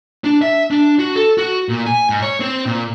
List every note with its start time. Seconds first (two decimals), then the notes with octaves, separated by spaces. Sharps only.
0.24 D4
0.42 E5
0.71 D4
0.99 F#4
1.15 A4
1.38 F#4
1.69 A#2
1.86 G#5
2.10 G#2
2.22 C#5
2.40 C4
2.66 A#2